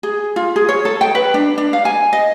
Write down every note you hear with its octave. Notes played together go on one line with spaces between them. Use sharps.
G#4
F4
G#4
C#5
A4
G5
B4
D4
D4
F5
G#5
D#5